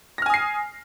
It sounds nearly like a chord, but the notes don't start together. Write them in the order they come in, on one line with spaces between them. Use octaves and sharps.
A#6 F6 G#5 D#6 C7